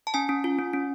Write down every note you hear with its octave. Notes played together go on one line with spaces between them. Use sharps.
A5
C#4 G#5
C#4
F4
C#4
C#4